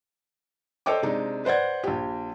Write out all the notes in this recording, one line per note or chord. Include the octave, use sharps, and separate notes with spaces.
A4 C5 C#5 D#5 G5 D6
C3 G#3 D4 D#4
B4 C5 D5 F#5 G#6
A#1 G4